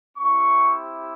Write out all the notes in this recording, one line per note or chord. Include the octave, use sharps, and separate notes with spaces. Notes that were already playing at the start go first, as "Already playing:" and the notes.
C4 E4 G4 C#6